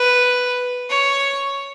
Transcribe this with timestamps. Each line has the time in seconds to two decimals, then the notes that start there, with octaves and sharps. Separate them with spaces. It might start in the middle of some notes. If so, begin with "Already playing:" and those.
Already playing: B4
0.90 C#5